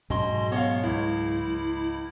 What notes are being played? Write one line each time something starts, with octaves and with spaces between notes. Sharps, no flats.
G#2 B2 F#3 C#4 D#5 C6
B3 C#5 F5
C#2 E4